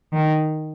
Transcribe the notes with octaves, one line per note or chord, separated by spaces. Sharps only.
D#3